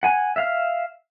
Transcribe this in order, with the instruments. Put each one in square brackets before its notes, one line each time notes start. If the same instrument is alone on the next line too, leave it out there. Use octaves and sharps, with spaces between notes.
[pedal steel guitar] F#5 G#5
E5 F5 F6